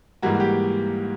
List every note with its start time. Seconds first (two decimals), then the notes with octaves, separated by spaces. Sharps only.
0.22 G#2 E3 G3 A#3 F#4
0.35 F#4
0.40 G4